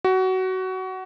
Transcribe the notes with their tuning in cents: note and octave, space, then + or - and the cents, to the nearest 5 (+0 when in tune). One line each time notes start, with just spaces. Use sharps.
F#4 +20